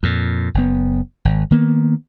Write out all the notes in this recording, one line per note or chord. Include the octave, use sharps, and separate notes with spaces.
F2 A#2
F#1 B3
G#1
D#3 A#3 B3